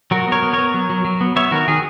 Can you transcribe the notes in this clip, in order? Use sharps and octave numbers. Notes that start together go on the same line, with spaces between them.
F#3 F#4 A#4
B3 A#4 C#5
B3
A#4 C#5
B3
F#3
F#3
F#3
B3
B3 C#5 E5
D#3 F#4 A#4
D#3 G#4